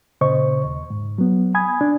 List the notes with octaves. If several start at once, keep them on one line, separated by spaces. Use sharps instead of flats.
A#2 C#3 C5 D#5 C#6
D#2
G#2
F#3 B3
G#5 B5 D#6 G#6
D4